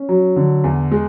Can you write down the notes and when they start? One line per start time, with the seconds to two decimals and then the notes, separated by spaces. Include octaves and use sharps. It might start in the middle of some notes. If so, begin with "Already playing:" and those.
Already playing: C#4
0.09 F#3
0.36 D3
0.64 E2
0.91 G#3